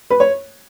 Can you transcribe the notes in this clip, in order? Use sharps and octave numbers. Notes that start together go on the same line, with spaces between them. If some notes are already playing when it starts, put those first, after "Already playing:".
B4
C#5